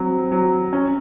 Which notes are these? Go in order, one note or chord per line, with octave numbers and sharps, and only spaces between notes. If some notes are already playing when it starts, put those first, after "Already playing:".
Already playing: F#3 C4
F#3
C#4